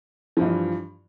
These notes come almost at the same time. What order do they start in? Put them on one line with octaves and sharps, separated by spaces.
F3 G2 E3